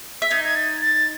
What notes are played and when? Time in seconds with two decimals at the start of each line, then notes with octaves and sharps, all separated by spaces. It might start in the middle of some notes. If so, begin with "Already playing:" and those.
0.22 E5
0.31 D#4 D#5 G#6
0.44 G#6
0.56 A6
0.81 A6